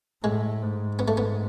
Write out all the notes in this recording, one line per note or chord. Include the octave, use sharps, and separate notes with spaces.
A2 G#3
G#2
B3
A3
B3